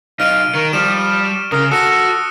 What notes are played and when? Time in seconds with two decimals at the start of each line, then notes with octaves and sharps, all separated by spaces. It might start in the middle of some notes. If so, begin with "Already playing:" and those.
0.20 B1 D#4 F5 F6 D7 D#7
0.55 D#3 A#4 C#6
0.73 F3 G3 E7
1.52 C#3 A#4 D#6 F6
1.72 F#4 A4 F#6 A#6 C#7